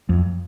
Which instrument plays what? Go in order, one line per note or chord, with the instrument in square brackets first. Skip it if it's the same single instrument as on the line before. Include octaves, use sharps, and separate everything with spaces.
[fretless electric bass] F2